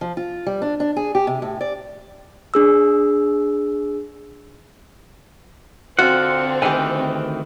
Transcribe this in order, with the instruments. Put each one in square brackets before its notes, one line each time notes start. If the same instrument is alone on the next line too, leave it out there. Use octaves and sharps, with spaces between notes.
[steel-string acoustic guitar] F3
F4
G3
D4
D4
G#4
G4
C3
A2
D5
[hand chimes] D4 G#4 E6
[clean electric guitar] D3 F4 F#5 [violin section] C4 [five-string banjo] F#4
[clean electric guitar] D2 D#3 E3 [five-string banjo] G4 G#5